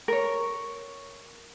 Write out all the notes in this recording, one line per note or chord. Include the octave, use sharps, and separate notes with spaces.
A#4 C#5